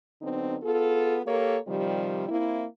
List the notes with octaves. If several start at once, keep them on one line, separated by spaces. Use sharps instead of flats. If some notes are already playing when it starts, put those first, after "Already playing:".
D3 F#3 B3 C4 D#4
B3 F4 G#4 A4
A#3 G4 A4 A#4 C#5
C3 D#3 F3 G3
A#3 C4 E4